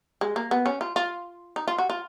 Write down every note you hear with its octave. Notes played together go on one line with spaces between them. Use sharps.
G#3
A#3
B3
C#4
F4
F4
D#4
F4
F#4
F4